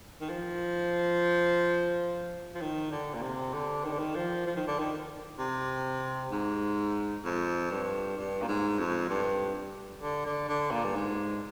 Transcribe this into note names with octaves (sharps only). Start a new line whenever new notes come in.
D#3
F3
F3
D#3
D3
A#2
C3
D3
D#3
D3
D#3
F3
F3
D#3
D3
D#3
C3
G#2
F2
G2
G2
A#2
G#2
F2
G2
D3
D3
D3
A#2
G2
G#2